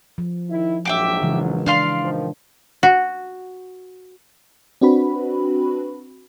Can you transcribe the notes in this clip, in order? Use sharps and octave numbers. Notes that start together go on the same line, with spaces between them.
F3
D#3 E4
A#1 G#2 F#3 E5 G5 D6
C#3 E3 G#3
D4 D5 F5 C6
A#2 D#3 F3
F#4
C4 D4 F#4 B4 B5